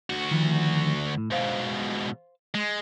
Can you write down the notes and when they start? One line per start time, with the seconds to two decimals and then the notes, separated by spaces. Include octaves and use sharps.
0.10 D2 F#4
0.31 D#3 F3
1.18 A2
1.32 G#2 B2 C5 F5
2.55 G#3